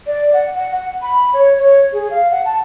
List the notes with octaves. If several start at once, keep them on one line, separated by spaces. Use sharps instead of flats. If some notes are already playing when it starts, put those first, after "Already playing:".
D5
F#5
F#5
F#5
B5
C#5
C#5
G#4
F5
F#5
A5